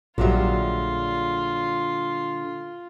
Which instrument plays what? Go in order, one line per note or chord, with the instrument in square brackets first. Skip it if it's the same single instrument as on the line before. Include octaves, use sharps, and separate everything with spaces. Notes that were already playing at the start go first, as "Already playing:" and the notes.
[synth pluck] A#1 [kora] A#2 F#3 G3 [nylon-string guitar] D3 G#4 E5 [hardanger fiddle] F4